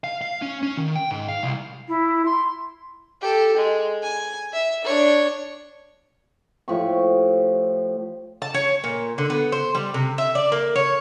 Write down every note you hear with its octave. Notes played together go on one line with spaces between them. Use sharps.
F5
F5
C#4
C#4
D#3
G5
G#2
F5
C2
E4
C6
G4 A4
G#3
G#5
E5
D4 C#5
A2 F3 G4 C#6
A5
C#5
A#2
D3
B3
C5
G3
C3
E5
D5
A#3
C#5